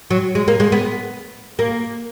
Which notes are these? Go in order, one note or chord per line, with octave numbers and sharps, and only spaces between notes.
F#3
G#3
A#3
G#3
B3
A#3